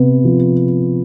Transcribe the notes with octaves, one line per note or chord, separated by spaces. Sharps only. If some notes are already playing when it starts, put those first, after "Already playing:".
Already playing: C3 B3
F3